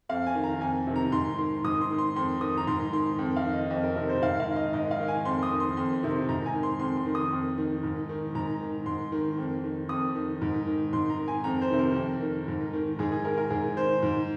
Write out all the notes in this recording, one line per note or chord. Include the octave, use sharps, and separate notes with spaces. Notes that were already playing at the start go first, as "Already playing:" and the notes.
F2 F5
G#5
D#3
A#5
F2 G#5
C3 D#3
A#5
G#2 C6
D#3 C6
G#2 D#6
C6
D#3
C6
F2 C6
D#3 D#6
A#5
G#2 C6
D#3 C6
F2
F5
D#3
D#5
F2 D#5
A#4
C3 D#3 A#4
C5
G#2 F5
F5
D#3
D#5
G#2 D#5
F5
D#3
G#5
F2 C6
D#6
D#3
C6
F2 C6
C3 D#3
G#2 A#5
G#5
D#3
C6
F2 C6
C6
D#3
D#6
F2
D#3
G#2
D#3
G#2 A#5
D#3
G#2 C6
D#3
F2
D#3
F2 D#6
D#3
G#2
D#3
G#2 C6
A#5
D#3
G#5
F2 A#5
C5
C3 D#3
A#4
F2
D#3
G#2
D#3
G#2 G#4
G#4
D#3 A#4
A#4
G#2 G#4
D#3 C5
G#2